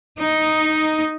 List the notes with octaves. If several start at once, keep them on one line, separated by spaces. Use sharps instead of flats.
D#4